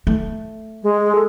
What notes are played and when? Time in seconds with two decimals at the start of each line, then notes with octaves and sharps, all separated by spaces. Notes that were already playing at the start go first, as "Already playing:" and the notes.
0.07 A3
0.83 G#3
1.15 A4